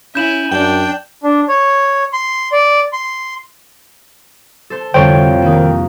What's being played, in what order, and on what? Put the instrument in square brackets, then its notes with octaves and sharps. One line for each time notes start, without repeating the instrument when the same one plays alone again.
[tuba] C#4 [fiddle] E4 G#5 [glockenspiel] G6 E7 F#7
[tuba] F#2 [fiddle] D4 [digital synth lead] G5
[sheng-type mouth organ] D4
C#5
C6
D5
C6
[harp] A4 C5
[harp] C2 F2 C#6 [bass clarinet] D3 [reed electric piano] C5 C#5 [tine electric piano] G5
[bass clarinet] D#3 [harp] A#3 D#4